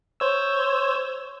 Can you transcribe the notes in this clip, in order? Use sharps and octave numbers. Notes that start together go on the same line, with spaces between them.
C5 C#5 E6